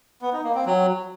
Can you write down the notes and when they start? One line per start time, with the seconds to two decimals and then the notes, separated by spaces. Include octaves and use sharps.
0.22 B3
0.33 D#4
0.44 A#3
0.55 C4
0.66 F#3